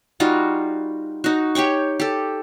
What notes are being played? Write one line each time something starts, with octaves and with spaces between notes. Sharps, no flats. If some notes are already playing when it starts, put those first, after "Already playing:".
G3 D#4 F4 F#4
D#4 F#4
G4 C#5 G5 C#6
G4 A4